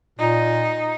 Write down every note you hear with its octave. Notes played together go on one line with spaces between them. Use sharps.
A#2 D#4